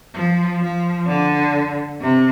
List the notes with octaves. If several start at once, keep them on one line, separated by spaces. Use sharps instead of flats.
F3
F3
D3
C3